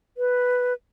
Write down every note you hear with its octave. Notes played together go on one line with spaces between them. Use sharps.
B4